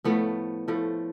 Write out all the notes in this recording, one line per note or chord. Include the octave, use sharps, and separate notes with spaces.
A2 F3 A3 B3
A2 F3 A3